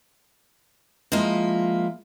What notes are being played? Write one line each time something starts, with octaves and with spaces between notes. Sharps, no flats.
F3 G#3 A#3 E4 F4